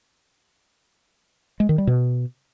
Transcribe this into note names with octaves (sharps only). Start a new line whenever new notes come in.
G#3
D#3
G3
B2